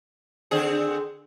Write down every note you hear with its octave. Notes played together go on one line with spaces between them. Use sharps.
D3 C4 G#4